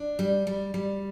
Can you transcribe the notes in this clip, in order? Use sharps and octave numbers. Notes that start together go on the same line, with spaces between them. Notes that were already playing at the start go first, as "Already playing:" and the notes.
Already playing: D4
G3
G3
G3